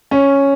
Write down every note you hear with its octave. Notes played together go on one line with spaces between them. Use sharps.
C#4